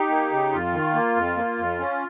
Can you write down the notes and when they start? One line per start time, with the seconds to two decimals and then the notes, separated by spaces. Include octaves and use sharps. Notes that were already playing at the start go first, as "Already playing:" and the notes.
Already playing: D#4 G4
0.09 A#3
0.32 C#3
0.52 F2 F4
0.74 D#3
0.94 A#3
1.16 F2
1.37 A#3
1.58 F2
1.79 C#4